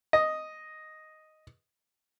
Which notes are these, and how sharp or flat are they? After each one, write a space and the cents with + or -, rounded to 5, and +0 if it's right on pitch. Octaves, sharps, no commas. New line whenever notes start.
D#5 +0